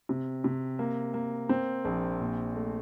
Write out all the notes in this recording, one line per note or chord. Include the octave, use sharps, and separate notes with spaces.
C3
C3
A#3
A#3
C4
A#1
A#2
A3